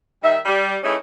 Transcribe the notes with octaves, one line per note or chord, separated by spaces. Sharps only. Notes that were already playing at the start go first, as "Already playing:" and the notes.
D#3 G3 D#4 E5
G3
E3 A3 C#4 D#4 E4 G#4